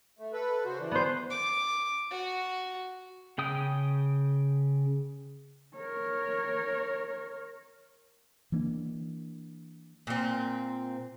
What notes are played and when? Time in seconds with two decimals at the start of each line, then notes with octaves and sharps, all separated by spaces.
0.19 A3
0.33 A4 B4
0.65 C#3 F#4 C5
0.80 E3 D4
0.91 B3 C5
1.30 D6
2.11 F#4
3.38 C#3 G5 D#6
5.76 A#4 C#5
8.52 E3 A#3 D4
10.07 A#2 C4